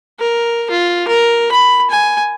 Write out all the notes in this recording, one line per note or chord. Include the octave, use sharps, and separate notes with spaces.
A#4
F4
A#4
B5
G#5